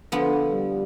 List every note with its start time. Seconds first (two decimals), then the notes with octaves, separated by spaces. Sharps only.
0.12 D3 F3 B3
0.52 G3